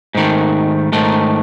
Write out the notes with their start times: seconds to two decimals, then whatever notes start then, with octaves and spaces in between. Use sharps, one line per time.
0.15 G#2 D#3 A3
0.92 G#2 D#3 A3